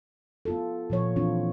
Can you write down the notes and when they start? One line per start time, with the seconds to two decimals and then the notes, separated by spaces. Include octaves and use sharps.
0.45 B3 F4 A4
0.90 A#2 F3 C#5
1.16 E3 C4 D4 F4